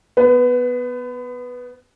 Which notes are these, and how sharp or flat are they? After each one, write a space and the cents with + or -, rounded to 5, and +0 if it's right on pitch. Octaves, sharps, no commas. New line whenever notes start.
B3 +0 B4 +30